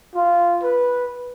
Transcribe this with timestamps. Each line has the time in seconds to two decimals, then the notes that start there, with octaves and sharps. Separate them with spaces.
0.15 F4
0.63 B4